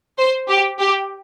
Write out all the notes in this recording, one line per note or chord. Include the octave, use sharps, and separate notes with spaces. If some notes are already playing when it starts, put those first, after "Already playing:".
C5
G4
G4